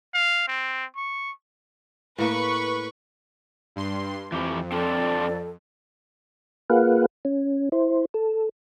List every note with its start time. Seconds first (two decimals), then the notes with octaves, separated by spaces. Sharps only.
0.14 F5
0.48 C4
0.96 C#6
2.18 A2 A#3 B4 C#6
3.76 G2 C6
4.32 F2 E3 G4
4.72 C4 D4 F4 A4 D5
6.70 A#3 F4 G#4 B4 F5 F#5
7.25 C#4
7.72 E4 C5
8.14 A4